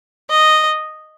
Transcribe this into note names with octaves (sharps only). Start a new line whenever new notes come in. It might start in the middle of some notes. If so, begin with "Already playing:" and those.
D#5